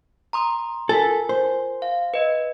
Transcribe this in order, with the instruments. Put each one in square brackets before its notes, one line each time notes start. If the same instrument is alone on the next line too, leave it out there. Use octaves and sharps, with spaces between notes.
[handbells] A#5 C6 D#6
[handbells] F4 A#4 G#5 [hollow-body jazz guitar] A4
[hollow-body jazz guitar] C5
[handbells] F5
B4 D#5